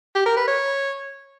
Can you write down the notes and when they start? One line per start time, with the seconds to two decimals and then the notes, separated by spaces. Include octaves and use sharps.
0.15 G4
0.26 A#4
0.37 B4
0.48 C#5